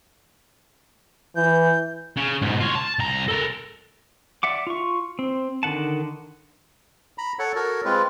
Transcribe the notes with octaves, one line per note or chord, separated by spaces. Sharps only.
E3 G6
C#3
G#2 B2
F4 C#5
A5
C2 A#5
A4 A#4
D5 E5 F#5 D6
F4 C#6
C4
D3 D#3 F#5 A5
A#5 B5
A4 C#5 F#5
F#4 A4 A#4 C#5
G#3 C4 F4 B4